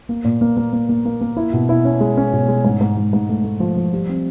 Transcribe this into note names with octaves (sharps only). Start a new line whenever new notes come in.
A#3
A#2
A#3
A#3
A#3
A#3
A#3
A#3
E4
B2
E4
C#4
G#3
C#4
B2
G#3
G#2
G#2
G#2
G#2
A3
A3
F3
F3
G3
C4